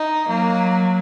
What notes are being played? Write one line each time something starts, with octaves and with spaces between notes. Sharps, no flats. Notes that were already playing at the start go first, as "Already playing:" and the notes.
Already playing: D#4
F#3 A#3